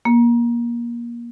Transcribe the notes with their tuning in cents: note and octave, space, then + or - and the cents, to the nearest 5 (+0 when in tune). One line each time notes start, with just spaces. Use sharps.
A#3 +25